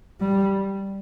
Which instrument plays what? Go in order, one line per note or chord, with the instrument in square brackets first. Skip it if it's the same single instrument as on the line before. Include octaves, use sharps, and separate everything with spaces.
[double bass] G3